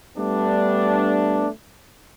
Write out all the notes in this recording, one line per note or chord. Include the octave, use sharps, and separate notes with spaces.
G3 A3 B3 D4